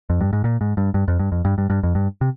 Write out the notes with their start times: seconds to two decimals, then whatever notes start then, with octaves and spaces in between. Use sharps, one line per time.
0.10 F2
0.21 G2
0.33 G#2
0.44 A#2
0.61 G#2
0.77 G2
0.94 G2
1.08 F2
1.19 G2
1.32 F2
1.45 G2
1.58 G2
1.70 G2
1.83 F2
1.95 G2
2.21 C3